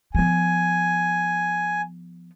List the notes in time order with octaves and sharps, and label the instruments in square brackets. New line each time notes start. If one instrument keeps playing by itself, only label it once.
[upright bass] F3 B3 [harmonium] G#5